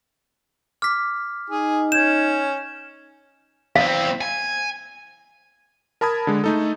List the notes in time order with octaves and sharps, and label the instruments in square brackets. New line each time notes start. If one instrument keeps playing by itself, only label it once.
[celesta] D6 [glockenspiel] F6 B6
[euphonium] D#4 [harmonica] G#4
[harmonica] C#4 [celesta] G6 G#6 [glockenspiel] E7
[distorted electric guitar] E2 C4 [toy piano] F5
[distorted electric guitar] G#5
[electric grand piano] A#4 A5 B5 D#6 G#6
D3 G#3
A3 D#4 A4